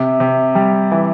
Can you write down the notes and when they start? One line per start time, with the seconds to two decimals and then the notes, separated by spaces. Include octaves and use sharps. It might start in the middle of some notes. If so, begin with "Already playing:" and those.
Already playing: C3
0.20 C3
0.55 G3
0.91 E3